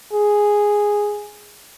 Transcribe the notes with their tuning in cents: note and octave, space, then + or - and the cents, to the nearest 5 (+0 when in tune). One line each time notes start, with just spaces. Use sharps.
G#4 -5